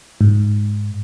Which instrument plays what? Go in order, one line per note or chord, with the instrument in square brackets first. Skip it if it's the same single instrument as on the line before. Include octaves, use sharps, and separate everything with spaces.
[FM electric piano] G#2